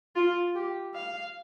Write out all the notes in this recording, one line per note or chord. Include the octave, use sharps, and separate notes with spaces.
F4
G4
F5